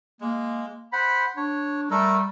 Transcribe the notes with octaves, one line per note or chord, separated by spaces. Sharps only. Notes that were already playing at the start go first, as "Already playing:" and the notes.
G#3 A#3
C5 F#5 B5
D4 C#5
G3 A3 A4 A#4